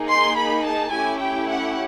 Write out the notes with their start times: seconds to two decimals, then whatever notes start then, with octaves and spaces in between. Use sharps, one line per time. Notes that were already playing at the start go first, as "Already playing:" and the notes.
Already playing: A#3 D#4 G#4
0.09 C6
0.37 B5
0.65 A5
0.93 A3 C#4 E4 G4 G#5
1.21 G5
1.49 F#5